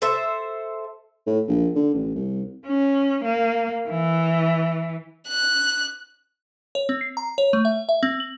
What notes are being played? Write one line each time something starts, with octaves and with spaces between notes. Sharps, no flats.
A4 C5 E5
A2
A#1
D3
A1
C2
C#4
A#3
E3
F#6
C#5
C4
C7
A#5
C#5
A3
E5
E5
C4
F#7